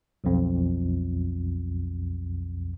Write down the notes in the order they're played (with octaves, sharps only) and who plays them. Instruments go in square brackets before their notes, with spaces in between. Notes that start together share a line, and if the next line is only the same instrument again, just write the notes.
[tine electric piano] B1 F2